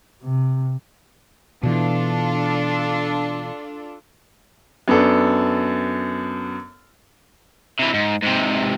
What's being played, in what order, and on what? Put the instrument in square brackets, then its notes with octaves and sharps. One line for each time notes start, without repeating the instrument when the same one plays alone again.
[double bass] C3
[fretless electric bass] B2 E3 [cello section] D4 F4 A4
[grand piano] F#2 B3 D4 A4
[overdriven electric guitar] C3 E3
G#2
G#2 C3